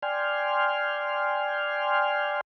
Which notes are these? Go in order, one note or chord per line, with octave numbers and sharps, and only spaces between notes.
D5 G5 G#5 C6 F6